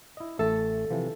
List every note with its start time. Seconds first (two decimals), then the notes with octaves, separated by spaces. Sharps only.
0.17 E4 D#5
0.39 A1 A3 A4 E5
0.91 C3 E3 F3